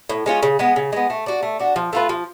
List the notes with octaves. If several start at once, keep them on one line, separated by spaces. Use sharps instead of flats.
A2
G#3 C#4 F4
C#3
G#3 B3
C#3
G#3 B3
A3
D4 F#4
A3
D4 F#4
F3
A3 F4 B4
F3